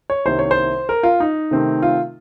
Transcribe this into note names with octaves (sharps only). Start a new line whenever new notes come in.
C#5
C2 C3 D#3 A#3 C#4 C5
C#5
C5
A#4
F4
D#4
C3 D#3 A3 C4
F4